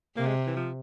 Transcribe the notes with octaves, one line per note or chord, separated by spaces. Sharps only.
C3 A#3
G#3
E3
F3